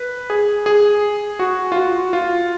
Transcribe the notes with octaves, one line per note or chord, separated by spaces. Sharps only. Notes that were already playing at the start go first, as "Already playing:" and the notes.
Already playing: B4
G#4
G#4
F#4
F4
F#4
F4